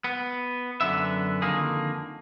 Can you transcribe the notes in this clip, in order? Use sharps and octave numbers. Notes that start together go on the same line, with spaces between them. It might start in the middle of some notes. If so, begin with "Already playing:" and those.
B3
F#2 D3 B3 E5
F2 D3 D#3 A#3 G#4